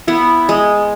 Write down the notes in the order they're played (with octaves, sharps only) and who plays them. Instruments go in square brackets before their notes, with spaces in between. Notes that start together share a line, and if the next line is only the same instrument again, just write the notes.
[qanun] B3 [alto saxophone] E4
[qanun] G#3